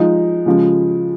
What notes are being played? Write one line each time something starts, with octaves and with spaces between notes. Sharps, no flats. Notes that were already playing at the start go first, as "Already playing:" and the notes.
Already playing: F3 G#3 D#4
C#3 F3 G#3